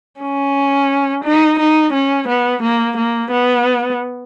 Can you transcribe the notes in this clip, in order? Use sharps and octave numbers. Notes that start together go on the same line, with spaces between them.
C#4
D#4
D#4
C#4
B3
A#3
A#3
B3